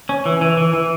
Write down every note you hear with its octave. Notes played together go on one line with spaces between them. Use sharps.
C#4
E3
E3
E3
E3